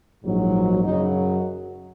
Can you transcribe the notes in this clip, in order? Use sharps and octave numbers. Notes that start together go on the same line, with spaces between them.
A#1 G#2 F#3
F#2 C#3 F#3 D#4